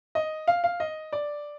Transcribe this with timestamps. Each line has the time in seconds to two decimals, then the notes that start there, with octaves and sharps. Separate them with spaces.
0.15 D#5
0.48 F5
0.64 F5
0.80 D#5
1.13 D5